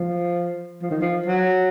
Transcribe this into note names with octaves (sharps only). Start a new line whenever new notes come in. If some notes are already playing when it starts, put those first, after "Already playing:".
Already playing: F3
F3
D#3
F3
F#3